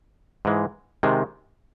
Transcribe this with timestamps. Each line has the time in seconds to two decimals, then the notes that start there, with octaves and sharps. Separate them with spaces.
0.45 G#2 E3 G#3
1.03 C3 D#3 G#3